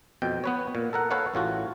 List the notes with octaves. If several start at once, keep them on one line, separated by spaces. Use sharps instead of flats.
F2 B2 G5
B3 B4 C#5
A#2
A4 A#4 F#5
A4 B4 C#5 F5 F#5
A1 A2 F4 F#4